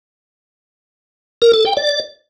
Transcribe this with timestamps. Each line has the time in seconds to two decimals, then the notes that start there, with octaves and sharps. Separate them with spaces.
1.42 A#4
1.53 A4
1.65 G5
1.77 D5